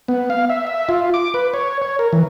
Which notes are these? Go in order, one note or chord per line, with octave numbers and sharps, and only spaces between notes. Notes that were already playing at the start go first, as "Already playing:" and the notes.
B3
F5
E5
E5
F4
D6
B4
C#5
C#5
A#4
E3